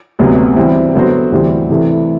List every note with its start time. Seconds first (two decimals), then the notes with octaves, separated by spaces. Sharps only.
0.19 D2 C3 F#3 B3
0.56 E3 G3 C4 E4 G4
0.94 D3 F#3 B3 F#4 C5
1.32 D2 C3 E3 G3 C4
1.70 C3 E3 A3 E4